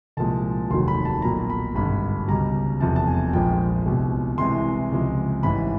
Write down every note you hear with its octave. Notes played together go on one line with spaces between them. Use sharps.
C2 A#2 F3 G#3 A5
F1 D#2 D#3 F#3 C6
B5
A5
B1 A#2 F#3 A#5
B5
G#1 G2 D3 B5
C#2 B2 G3 A#5
F1 E2 C3 F3 A5
A5
G#5
A#1 A#2 F3 G#3 G5
C2 B2 G#3
C2 C3 E3 G#3 C6
C#2 C3 F3 G#3
A1 G#2 E3 B5